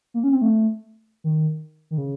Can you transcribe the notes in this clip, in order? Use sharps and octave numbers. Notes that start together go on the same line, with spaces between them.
A#3
C#4
C4
A3
D#3
D#3
C#3